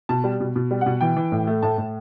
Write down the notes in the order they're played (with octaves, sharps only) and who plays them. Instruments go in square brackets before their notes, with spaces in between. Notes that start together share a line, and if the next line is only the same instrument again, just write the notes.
[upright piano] B2 A5
G3
B2
B2
G3
F#5
B2
E3 G5
E3
A2
A3
A2 A5
A2